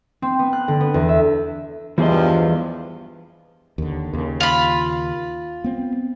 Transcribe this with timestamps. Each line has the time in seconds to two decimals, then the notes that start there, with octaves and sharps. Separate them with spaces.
0.22 C4
0.39 B3
0.53 F#6
0.68 D3
0.80 B3
0.94 E2
1.09 E5
1.98 E2 G2 E3 F3 G#4 D#5
3.78 D#2 D3
4.13 D#2 C#3
4.40 F4 B5
5.64 B3 C4